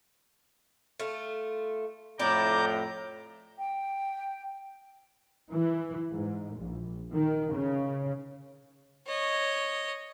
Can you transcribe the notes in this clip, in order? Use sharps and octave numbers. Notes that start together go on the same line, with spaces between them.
A3 F4
F2 A2 E4 D5 A#5 D6 G6
G5
E3
G#2
A#1
D#3
C#3
C#5 D#5